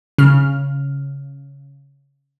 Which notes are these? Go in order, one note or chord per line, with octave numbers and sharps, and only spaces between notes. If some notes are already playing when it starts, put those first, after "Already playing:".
C#3 F6